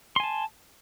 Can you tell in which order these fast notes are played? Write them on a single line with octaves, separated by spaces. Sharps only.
C6 G#5 A5